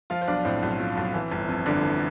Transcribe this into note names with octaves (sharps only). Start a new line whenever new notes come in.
F3 F4 F5
C5
B1 D4 D5
A2 C4 C5
B1
F3
B1
E3
G1
F2
G1 D3 D4
E3